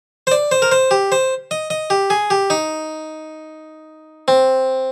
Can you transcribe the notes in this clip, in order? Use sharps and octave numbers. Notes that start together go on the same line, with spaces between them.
C5
D5
C5
A#4
C5
G4
C5
D#5
D#5
G4
G#4
G4
D#4
C4